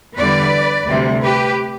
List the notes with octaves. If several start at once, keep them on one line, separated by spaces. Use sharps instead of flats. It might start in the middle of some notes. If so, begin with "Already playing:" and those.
E2 D3 G3 B4 D5
D2 C3 G3
G4 B4